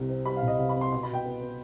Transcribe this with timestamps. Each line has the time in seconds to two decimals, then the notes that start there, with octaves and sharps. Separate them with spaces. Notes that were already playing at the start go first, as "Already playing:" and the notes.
Already playing: C2 C3 G3
0.10 C4
0.25 G3 B5
0.37 F5
0.42 C2
0.48 D#5
0.58 C3 F5
0.69 B5
0.75 C4
0.81 C6
0.92 B2 C6
1.03 B5
1.08 B2
1.14 G5
1.26 B3
1.42 B3